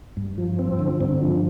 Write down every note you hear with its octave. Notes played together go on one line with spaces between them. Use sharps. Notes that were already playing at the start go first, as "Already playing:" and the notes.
G2
F3
C4
D3
G2
F3